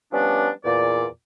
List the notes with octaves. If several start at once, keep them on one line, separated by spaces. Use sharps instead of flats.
F3 G3 B3 C#4 D4
E2 A#2 D5